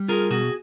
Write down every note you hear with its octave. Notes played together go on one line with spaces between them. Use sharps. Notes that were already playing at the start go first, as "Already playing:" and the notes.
Already playing: G3
F4 G#4 A#4
B2 F#4 G#4